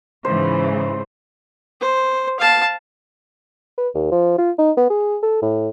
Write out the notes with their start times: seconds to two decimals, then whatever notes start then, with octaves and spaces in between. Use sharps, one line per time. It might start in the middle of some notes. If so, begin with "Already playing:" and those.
0.25 G#2 C#3 E3 C5
1.81 C5
2.40 F5 A5
3.78 B4
3.95 D#2
4.11 F3
4.38 F4
4.59 D#4
4.77 B3
4.90 G#4
5.23 A4
5.42 A2